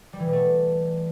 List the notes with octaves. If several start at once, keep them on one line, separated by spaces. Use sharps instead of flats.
G3
E3
B2
A3